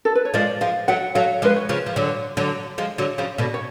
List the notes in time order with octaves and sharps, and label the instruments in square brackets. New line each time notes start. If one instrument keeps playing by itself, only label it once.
[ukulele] A4
B4
C#5
[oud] F3 G#3 [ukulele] D5
[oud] F3 G#3 [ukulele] F5
[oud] F#3 A3 [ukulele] F#5
[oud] F#3 A3 [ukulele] F5
[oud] F3 G#3 [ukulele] B4
[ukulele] C#5
[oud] C#3 F3
F3
D3 F#3
D3 F#3
F3 G#3
D3 F#3
C#3 F3
B2 D3
[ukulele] C#5